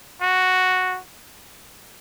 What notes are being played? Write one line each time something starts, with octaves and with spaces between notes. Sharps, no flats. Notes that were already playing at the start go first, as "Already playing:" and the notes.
F#4